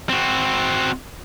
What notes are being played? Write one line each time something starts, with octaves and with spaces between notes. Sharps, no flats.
C4 F#4